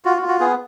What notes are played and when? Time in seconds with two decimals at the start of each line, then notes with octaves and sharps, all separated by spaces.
0.05 F4 F#4
0.17 F#4
0.22 F4
0.28 F#4
0.40 B3 G#4